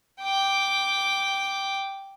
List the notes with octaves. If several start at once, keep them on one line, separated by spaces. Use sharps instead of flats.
G5 D6